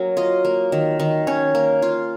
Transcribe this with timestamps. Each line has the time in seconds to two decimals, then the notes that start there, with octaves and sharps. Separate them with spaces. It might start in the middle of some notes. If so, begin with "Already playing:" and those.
Already playing: F#3 A#3 C#4 A#4
0.17 F4 D#5
0.45 A#3
0.72 D#3
1.00 D#3
1.27 C#4 C#5
1.55 A#3
1.82 F4